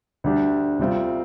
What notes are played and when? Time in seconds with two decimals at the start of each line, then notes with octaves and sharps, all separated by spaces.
0.24 D2 D3 G3 D4 G4
0.79 D2 C3 G3 C4 F4